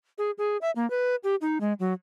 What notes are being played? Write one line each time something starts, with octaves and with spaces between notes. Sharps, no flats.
G#4
G#4
E5
A#3
B4
G4
D#4
G#3
F#3